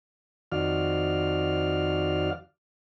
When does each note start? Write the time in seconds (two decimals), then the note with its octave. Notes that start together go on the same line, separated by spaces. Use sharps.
0.52 F2 D#3 F#4 D5 F5 F6